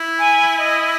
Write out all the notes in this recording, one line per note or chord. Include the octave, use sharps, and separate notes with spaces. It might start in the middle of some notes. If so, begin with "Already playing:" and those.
Already playing: E4
G#5
D#5